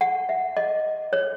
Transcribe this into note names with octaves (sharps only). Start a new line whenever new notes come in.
F#5
E5
D#5
C#5